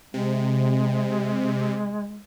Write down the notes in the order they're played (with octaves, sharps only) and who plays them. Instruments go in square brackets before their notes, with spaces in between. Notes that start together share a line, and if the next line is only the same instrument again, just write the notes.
[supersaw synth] C3 [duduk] G#3